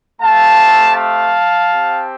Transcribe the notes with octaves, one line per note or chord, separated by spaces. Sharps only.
A3 C4 G4 F5 A5
F5 A5
C4 G4